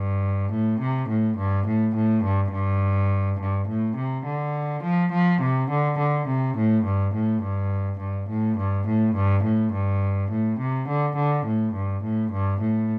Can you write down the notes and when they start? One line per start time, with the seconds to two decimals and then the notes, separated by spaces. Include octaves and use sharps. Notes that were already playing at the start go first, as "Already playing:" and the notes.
Already playing: G2
0.51 A2
0.80 C3
1.09 A2
1.37 G2
1.67 A2
1.95 A2
2.24 G2
2.52 G2
3.40 G2
3.68 A2
3.96 C3
4.25 D3
4.83 F3
5.12 F3
5.41 C3
5.70 D3
5.98 D3
6.28 C3
6.57 A2
6.85 G2
7.14 A2
7.42 G2
7.99 G2
8.29 A2
8.58 G2
8.87 A2
9.16 G2
9.43 A2
9.73 G2
10.31 A2
10.59 C3
10.88 D3
11.16 D3
11.46 A2
11.74 G2
12.03 A2
12.32 G2
12.61 A2